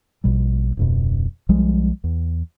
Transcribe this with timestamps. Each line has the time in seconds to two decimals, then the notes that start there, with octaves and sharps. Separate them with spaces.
0.24 A#1 B2 G3
0.77 D1 F2 B2
1.49 B1 F3 G3 G#3
2.04 E2